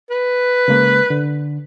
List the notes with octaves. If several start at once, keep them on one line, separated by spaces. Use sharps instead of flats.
B4
C#3 G#3 A#3
D3